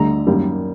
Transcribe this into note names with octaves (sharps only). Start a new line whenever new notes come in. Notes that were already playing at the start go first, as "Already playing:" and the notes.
Already playing: D2 D3 G3 A#5
F#2 D#3 G3 A#3